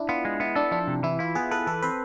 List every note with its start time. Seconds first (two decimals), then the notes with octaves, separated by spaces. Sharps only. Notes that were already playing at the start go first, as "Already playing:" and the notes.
Already playing: D4 E4
0.09 B3 F4
0.25 G#3
0.40 B3 E4
0.55 D4 A4
0.71 F3 D4
0.87 C3
1.03 E3 E4
1.19 E4 F4
1.35 B3 G#4
1.51 A4 B4
1.67 E3 A4
1.82 C4 B4